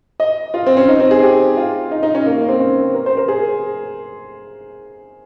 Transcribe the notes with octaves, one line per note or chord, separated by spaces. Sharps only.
D#5
F4
C4
C#4
D#4
C4
G#4
G4
F4
D#4
D#4
C#4
A#3
A#3
C4
C#4
A#4
C5
A#4
G#4